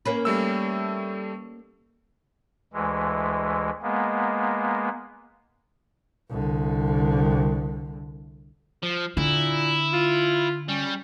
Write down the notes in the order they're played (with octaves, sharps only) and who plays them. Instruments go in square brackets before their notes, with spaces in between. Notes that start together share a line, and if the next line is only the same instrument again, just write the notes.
[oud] A#3 C#4 B4
[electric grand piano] G3 A3 E6
[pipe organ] D2 E3 G#3
G#3 A#3 B3
[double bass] C2 D3
[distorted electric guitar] F3
[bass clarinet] A#2 [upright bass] D3 [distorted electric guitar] E4
[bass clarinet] F4
[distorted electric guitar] G3 [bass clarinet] C#4